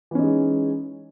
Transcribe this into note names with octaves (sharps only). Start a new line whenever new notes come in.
E3 G#3 C#4 D#4